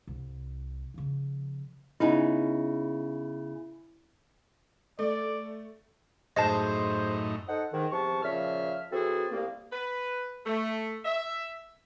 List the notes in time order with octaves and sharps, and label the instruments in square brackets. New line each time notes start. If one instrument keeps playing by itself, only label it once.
[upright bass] C2
C#3 F3
[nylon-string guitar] C#3 B3 D#4 [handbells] E4
[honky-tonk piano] A3 [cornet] D5
[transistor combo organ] F#2 A2 D#4 [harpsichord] G#3 [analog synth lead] C5 [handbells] D#5 A5
[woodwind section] D#4 A4 C5 F#5
G#2 D#3
E2 C3 F3 A5 C#6
A#2 C#3 F3 E5 F6
E3 C4 F#4 G#4 A4
C2 A#3
[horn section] B4
A3
E5